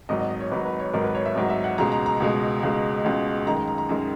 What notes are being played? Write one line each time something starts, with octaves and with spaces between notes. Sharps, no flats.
G#1 G#2 F#3 D#5
D#5
D#5
C#5
G#1 G#2 F#3 B4
B4
C#5
G#1 G#2 F#3 A#4
B4
C#5
E5
G#1 G#2 F#3
E5
F#5
C#2 B2 G#3 A#5
A#5
A#5
C#2 B2 G#3
C#2 B2 G#3
C#2 B2 G#3
F#2 D#3 G#3 A#5
A#5
A#5
A#5
F#2 D#3 G#3